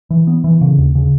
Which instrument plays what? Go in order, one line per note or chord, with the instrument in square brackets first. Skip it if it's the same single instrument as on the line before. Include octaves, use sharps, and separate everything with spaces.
[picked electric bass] E3
B3
E3
C#3
D#2
C#3